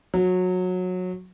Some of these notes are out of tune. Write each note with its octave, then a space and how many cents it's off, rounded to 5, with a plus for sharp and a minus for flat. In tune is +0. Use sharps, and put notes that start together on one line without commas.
F#3 -20